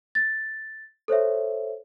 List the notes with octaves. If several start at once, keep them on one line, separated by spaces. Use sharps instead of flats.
A6
A4 C5 C#5 E5